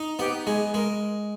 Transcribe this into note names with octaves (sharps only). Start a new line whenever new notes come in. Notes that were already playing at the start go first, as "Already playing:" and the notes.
Already playing: D#4
B3 G4
G#3 G#4
G#3 A#4